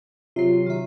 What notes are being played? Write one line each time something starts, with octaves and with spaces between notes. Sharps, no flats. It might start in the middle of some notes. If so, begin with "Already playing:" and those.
C3 F#3 F4 C7
D#3 E5